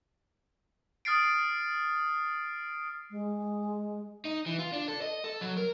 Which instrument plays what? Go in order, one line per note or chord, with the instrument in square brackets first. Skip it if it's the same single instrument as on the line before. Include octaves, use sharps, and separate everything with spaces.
[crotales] D#6 F6 A6 C7 D7
[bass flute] G#3
[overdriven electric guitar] D#4
E3
F4
D4
A4
D#5
A4
F#3
A#4